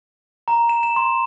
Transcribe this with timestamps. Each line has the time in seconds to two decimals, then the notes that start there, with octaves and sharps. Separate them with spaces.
0.48 A#5
0.69 E7
0.83 E7
0.96 C6